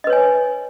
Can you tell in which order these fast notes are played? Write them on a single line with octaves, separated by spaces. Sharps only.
D#5 B4 C#5 G#5